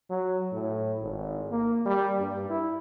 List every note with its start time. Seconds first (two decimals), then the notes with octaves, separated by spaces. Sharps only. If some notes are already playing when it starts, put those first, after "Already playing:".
0.10 F#3
0.52 A2
1.02 G#1
1.51 A#3
1.85 G3
2.19 G2
2.50 E4